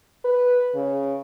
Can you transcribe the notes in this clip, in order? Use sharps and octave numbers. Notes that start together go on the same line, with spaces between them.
B4
C#3